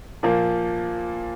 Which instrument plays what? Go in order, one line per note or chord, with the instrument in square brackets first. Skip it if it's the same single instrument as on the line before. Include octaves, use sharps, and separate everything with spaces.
[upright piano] A#2 F3 A#3